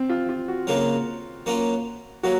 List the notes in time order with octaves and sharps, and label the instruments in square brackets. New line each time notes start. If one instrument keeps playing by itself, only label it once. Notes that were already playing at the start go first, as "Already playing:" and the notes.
Already playing: [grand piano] C4
F4
F4
F#4
[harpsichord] C#3 F#3 A#3
F#3 A#3 C#4 F4
[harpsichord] F#3 A#3 [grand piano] F#4